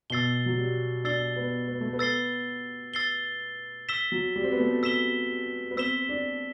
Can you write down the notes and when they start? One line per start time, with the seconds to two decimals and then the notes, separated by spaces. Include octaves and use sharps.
0.10 B2 E6 A6 C7 G7
0.46 F#3
0.58 G3
1.04 D4 E6 A6 C7 G7
1.36 B3
1.68 B3
1.81 A3
1.93 B3
1.99 E6 A6 C7 G7
2.94 E6 A6 C7 G7
3.89 E6 B6 E7 G7
4.12 F#3
4.36 G3
4.44 C4
4.52 B3
4.60 A3
4.83 E6 B6 E7 G7
5.71 B3
5.77 C4 E6 B6 E7 G7
6.09 D4